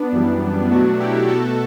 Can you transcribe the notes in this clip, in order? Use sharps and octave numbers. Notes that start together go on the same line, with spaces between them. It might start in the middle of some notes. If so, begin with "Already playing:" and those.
Already playing: B3 D4
F#2 E3 G3
B2 F#3 A3 D4 F#4
E4 G4
B2 A3 F#4 A4